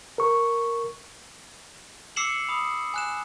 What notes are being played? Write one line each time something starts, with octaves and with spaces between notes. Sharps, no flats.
A#4 C#6
D6 E6 C7 C#7 E7 F#7
B5 D#6
G#5 F#6 E7